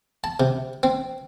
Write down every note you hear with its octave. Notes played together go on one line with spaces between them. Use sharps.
A5
C3
C4